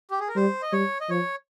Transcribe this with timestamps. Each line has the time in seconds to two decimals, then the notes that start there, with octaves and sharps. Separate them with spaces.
0.11 G4
0.20 G#4
0.28 A#4
0.36 G3 C5
0.62 D#5
0.73 G3 C#5
1.01 D#5
1.09 F3 C#5